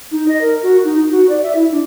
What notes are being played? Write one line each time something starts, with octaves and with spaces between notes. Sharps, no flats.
D#4
D#5
A#4
F#4
D#4
D#4
F#4
D5
E5
E4
D4